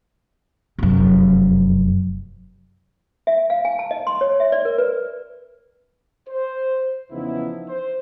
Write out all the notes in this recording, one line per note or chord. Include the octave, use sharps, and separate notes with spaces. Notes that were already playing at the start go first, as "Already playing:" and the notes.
F1 F#2
E5
F5
G#5
A5
D#5
C6
C#5
E5
D5
A#4
B4
C5
E2 C#3 F3 B3 D#4 E4
C5